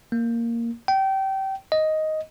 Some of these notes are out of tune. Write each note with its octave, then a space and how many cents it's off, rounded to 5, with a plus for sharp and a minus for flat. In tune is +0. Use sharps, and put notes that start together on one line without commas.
A#3 -5
G5 -25
D#5 +5